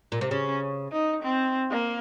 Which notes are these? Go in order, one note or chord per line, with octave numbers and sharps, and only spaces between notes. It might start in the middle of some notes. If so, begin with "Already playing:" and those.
A#2
C3
C#3 C#4
D#4
C4
A#3